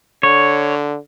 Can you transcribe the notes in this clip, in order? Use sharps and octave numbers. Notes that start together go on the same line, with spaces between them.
D3 C#5